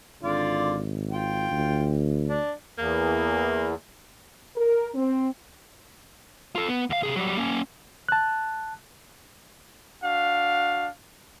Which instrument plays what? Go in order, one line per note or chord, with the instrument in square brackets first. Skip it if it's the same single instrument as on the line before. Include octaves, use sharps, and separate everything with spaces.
[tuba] G#1 [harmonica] D3 F4 D5
[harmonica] F4 G5
[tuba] D2
[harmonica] D4
[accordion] E2 [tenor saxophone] A#3
[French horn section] A#4
C4
[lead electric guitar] F4 A4
B3
D2 F5
C3 G#4
F#3 G3
A#3 C#4
[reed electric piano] A5 F#6
[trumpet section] D4 F#4 F5